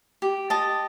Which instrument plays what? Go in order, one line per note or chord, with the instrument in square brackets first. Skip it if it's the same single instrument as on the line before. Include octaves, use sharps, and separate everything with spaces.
[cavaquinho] G4
D#5 A5